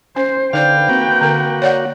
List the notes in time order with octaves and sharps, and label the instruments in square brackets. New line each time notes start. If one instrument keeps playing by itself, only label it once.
[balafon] C#4 [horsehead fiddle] C5
[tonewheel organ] D3 F5 [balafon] D#4 C5 D5 [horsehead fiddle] B4 G5
[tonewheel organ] A#3 F#4 [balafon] C4
[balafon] D3 A#4
C#5 D5 F#5